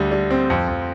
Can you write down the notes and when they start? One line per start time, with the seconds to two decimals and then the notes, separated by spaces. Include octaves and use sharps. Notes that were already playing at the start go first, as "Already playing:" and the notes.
Already playing: D2 D3 G3
0.11 G3
0.31 C4
0.50 F2
0.68 F2